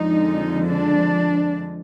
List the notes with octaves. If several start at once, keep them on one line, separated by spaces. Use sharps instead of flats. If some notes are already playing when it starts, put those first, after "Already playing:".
Already playing: F2 D3 F3 G#3 D#4
D4